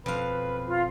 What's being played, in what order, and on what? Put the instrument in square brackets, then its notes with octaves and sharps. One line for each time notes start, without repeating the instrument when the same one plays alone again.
[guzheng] F2 F5 [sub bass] B2 [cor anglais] B4
[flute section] F4